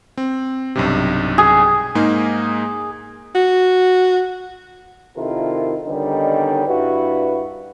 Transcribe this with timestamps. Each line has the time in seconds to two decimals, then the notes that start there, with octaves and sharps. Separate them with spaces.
0.17 C4
0.75 B1 G2 C3
1.38 G#4
1.95 G#2 A#3 D#4
3.35 F#4
5.17 C3 D#3 E4 F4 A4 A#4
5.86 D3 D#3 G3 B3 C#4 D#4
6.67 G2 E4 F#4 B4